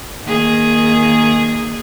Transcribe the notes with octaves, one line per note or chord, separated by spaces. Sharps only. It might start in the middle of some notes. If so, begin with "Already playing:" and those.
D#3 A#3 G#4